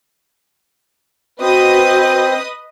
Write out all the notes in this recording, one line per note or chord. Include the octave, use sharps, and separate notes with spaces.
C4 F#4 B4 D#5 D#6